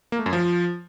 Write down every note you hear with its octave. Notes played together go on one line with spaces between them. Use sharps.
A#3
A3
F#2
F3